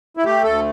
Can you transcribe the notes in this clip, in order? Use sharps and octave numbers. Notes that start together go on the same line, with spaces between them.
E4
A3 G4
D2 A4